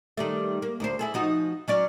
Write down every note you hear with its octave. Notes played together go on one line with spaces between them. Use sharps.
D#3 G3 A3
A#3
D2 A#4 C5
E4 G#4 A4
F3 D#4 F#4
F#3 C#4 D5